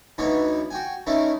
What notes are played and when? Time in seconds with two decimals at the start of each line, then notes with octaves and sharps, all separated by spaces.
0.18 D2 E3 B3 D#4 C#5
0.71 F#4 G5 G#5
1.07 E3 A3 C#4 D#4 E4